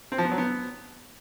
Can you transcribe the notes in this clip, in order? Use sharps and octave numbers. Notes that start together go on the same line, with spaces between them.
C4
F3
B3
F#3
B3